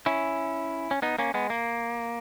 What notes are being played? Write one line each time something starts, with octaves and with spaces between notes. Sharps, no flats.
C#4 E4
C#4
B3 D#4
A#3 C#4
G#3 B3
A#3